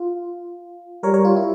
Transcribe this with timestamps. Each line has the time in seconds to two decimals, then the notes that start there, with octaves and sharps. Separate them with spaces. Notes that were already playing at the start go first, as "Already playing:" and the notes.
Already playing: F4
1.03 G3 A#4 C#5
1.14 A#4 C#5
1.25 F4
1.36 E4